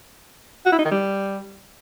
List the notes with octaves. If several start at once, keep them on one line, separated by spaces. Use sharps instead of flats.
F#4
E4
D#4
D#3
G3